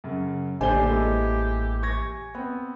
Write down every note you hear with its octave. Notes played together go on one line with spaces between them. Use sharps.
F#2 C#3
A1 D3 A#3 D4 G4 C5 G#5 G7
E3 G#3 A4
C#6 G#6 A#6
B3 C4